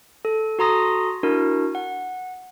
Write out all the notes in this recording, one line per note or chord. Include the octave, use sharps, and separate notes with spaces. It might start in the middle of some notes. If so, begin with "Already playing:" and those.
A4
F#4 A4 A#5 C6 D#6 A#6
D4 E4 F#4 A#4
F#5